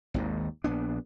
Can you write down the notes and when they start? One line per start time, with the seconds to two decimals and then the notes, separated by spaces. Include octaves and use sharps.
0.14 G#1 D#2 G#2
0.64 A#1 B3 D4